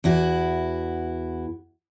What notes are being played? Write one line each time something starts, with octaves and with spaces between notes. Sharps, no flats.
E2 E4 F#4